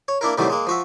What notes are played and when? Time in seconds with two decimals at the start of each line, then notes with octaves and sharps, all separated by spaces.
0.08 C#5
0.21 A#3 D4 E4 A#4
0.38 A2 C3 D#3 E3 F#3 G3
0.50 G#3 A#3
0.67 F3 F#4 E5